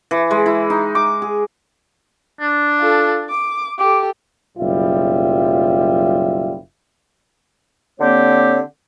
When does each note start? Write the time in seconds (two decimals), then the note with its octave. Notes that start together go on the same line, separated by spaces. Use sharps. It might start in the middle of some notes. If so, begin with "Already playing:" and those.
0.11 E3
0.31 G#3
0.46 E4
0.70 D#4
0.95 D6
1.22 G#4
2.41 D4
2.80 F4 A4
3.29 D6
3.79 G4 A4 D6
4.58 F#1 B1 G3 F4 E5
8.00 D3 A#3 C4 G4 C#5